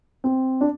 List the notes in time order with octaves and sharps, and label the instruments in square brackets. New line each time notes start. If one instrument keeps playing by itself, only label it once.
[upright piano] C4
D4